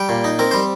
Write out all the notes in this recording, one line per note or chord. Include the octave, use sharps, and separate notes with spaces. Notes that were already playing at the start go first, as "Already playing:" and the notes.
Already playing: G3 G5
A#2
D#4
C4 A#4
G3 C5